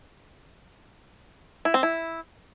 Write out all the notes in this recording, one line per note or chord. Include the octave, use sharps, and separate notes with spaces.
E4
C4
E4